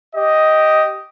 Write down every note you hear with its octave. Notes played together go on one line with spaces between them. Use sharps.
G4 D#5